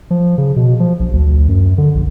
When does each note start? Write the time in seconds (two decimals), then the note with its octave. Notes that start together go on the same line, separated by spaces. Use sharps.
0.11 F3
0.38 C#3
0.56 B2
0.80 F3
1.00 A#1
1.13 D2
1.48 F#2
1.78 D3
1.95 A#1